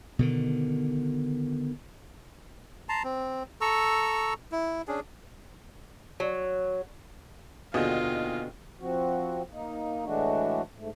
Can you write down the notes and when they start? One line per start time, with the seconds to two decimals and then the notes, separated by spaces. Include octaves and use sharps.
0.19 B2 D3 D#3
2.89 A5 A#5 C6
3.04 C4
3.61 A4 A#5 C#6 E6
4.52 E4
4.88 C#4 D4 G#4
6.20 F#3
7.74 D#2 B2 D3 F4 G#4 D#5
8.81 F3 C4 F#4
9.52 A#3 D#4
10.04 A2 E3 G#3 A3 D4 F#4
10.78 G#2 A3